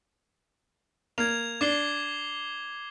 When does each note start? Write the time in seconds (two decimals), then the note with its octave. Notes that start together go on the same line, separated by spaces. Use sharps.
1.18 A#3 G#6 F7
1.61 D4 D6 C7 G7